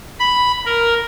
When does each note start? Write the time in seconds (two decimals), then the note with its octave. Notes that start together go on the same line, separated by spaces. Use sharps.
0.20 B5
0.65 A#4